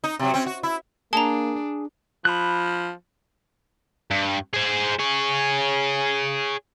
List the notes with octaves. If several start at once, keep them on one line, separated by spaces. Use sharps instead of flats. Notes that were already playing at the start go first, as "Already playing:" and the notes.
D#4
C3 F#3
C4 C#4
F#4
E4
A#3 D4 G#4 A5 A#5
F3 B5 F#6
G2
G#4 C5
G#4 C#5